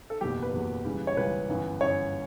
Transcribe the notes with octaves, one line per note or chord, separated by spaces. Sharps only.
A4
F#1 E2 B2 F#3 G4
B4
F#1 E2 B2 F#3
C#2 C#3 E3 G3
C#5
C#2 C#3 E3 G3 B4
G1 F#2 E3
G1 F#2 E3 C#5